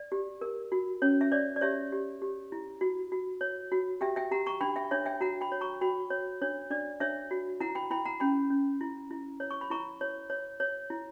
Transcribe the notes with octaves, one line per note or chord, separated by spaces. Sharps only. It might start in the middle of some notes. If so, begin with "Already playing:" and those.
Already playing: D5
G4
A#4
F#4
C#4 C#5
E5
C#5 D5
D5
G4 C#5 E5
G4
G4
E4
F#4
F#4
C#5
F#4
G4 E5 G5
E5 G5
G4 F#5 A#5
A#5 C#6
D4 G5 B5
E5 G5
D4 C#5 E5
E5 G5
F#4 F#5 A#5
G5 B5
C#5
A#5 C#6
F#4 G5 B5
C#5
D4 C#5
D4 D5
D4 C#5 E5
F#4
E4 F#5 A#5
G5 B5
E4 G5 B5
F#5 A#5
C#4 G5 B5
C#4
E4
E4
C#5
C#6
B5
E4 A#5 C#6
C#5
C#5
C#5
E4